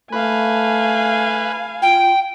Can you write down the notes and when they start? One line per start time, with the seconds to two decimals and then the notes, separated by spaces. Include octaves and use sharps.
0.12 A3 B4 F5 G#5
1.82 F4 G5